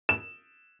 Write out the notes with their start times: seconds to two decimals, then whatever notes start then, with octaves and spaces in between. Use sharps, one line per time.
0.09 E7